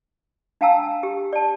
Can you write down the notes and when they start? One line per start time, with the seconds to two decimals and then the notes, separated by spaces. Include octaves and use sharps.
0.61 D4 F5 G5 A5 A#5 E6
1.03 G4
1.33 D5 A5